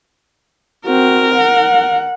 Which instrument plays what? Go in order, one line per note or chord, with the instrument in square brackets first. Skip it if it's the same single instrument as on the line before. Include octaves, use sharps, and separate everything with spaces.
[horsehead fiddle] C4 F#4 [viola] A#4
[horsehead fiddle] F#5